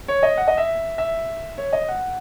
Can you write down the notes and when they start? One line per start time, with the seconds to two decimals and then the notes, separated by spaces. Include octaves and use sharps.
0.08 C#5
0.23 D#5
0.37 F#5
0.48 D#5
0.57 E5
0.98 E5
1.58 C#5
1.73 D#5
1.88 F#5